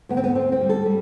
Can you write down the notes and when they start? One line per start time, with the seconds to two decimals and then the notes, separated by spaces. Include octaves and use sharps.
0.09 D2 B3
0.17 C4
0.24 B3
0.35 D2 C4
0.52 C4
0.61 G3
0.69 A4
0.86 G3